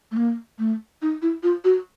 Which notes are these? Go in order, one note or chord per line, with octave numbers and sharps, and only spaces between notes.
A3
A#3
A3
D#4
E4
F4
F#4